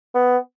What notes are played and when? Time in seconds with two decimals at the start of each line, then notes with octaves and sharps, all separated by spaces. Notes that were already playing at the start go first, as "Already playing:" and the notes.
0.14 B3